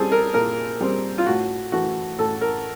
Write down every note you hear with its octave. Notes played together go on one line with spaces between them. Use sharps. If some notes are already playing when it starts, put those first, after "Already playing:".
Already playing: G3 C4 G#4 A4
A#4
A#2 A#4
G3 C4
F4
A2 F#4
E3 A3 F#4
A2 A4
A#4